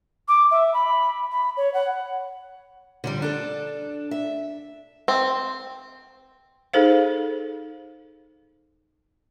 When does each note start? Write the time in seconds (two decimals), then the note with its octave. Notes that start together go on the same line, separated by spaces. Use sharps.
0.28 D6
0.51 E5
0.74 B5
1.31 B5
1.57 C#5
1.74 F#5
3.04 D3 F3 G3
3.22 D4 A4
4.11 E5
5.08 C4
6.74 D#4 G#4 A4 C5 F5